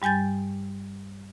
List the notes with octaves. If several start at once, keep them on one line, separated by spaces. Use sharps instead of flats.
G2 G3 G#5 G6 A6